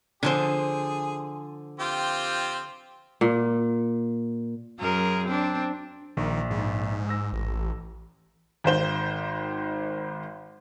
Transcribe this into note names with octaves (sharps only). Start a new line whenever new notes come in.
D3 F3 G#4 C5
C4 F4 G4
A#2
F#2 G#4 A#4
C4 D4
A#1 D#3
G#2
E6 A#6
A1
G#1 D#3 C5 G7